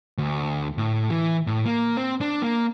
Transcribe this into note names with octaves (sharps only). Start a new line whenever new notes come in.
D2
A2
E3
A2
A#3
C4
D4
A#3